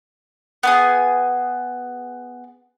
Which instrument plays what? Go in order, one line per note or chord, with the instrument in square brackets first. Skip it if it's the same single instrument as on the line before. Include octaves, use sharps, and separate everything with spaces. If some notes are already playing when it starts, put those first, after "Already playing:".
[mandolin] B3 D4 G#4